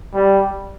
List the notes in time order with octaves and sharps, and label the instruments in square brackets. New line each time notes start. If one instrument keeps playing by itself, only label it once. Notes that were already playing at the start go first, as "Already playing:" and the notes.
[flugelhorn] G3